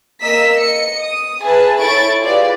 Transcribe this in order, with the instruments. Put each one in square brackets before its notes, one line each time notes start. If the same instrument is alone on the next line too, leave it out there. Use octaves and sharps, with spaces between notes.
[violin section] A#3 A#4 D#5 E6 B6
D#5 C#7
D#6
G#4 B4 E5 G#5 A5
E4 A4 C#5 C#6 A6 D7
E4 F4 G4 G#4 B4 D5